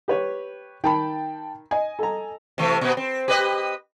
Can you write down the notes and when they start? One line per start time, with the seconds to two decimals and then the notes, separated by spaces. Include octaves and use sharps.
0.08 G4 B4 C#5
0.84 D#3 G5 A5 B5
1.71 D#5 G#5
1.99 A4 A#5
2.58 C3 E3 A3
2.81 B2 B3
2.97 C4
3.28 G4 B4 D#5